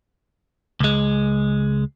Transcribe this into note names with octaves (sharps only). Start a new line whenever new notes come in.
C#2 G#3